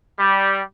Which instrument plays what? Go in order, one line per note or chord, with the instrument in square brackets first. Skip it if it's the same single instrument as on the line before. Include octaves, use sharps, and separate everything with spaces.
[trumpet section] G3